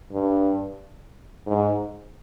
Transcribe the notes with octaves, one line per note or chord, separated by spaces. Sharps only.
G2
G#2